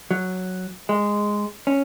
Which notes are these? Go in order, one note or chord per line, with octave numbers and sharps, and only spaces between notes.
F#3
G#3
C#4